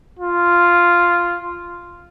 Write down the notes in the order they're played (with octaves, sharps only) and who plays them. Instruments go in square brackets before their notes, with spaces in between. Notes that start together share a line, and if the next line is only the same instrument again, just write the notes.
[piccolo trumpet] F4